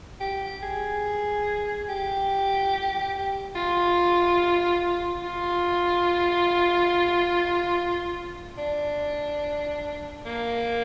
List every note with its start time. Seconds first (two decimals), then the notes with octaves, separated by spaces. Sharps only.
0.20 G4
0.63 G#4
1.89 G4
3.55 F4
5.23 F4
8.58 D4
10.26 A#3